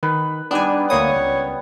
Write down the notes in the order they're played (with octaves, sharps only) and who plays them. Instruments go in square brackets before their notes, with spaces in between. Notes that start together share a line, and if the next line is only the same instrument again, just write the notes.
[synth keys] D#3 [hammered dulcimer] B4
[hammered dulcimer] G3 B3 [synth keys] D4 D#4 G#5
[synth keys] D2 A#3 D#6 [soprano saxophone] C#5
[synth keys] C#2